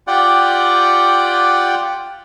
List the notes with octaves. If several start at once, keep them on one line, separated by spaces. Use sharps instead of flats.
F4 G4 D5 F#5 G5